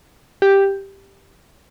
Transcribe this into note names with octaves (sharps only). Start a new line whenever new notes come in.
G4